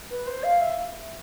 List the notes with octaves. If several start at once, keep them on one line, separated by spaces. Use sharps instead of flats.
B4
C5
F5
E5